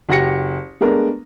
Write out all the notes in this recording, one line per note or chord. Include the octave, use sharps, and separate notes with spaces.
F#1 F#4 G4 A#6 C#7
G#3 A3 B3 D4 A#4